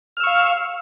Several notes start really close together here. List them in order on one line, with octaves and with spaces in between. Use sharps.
F6 E6 C#6 F5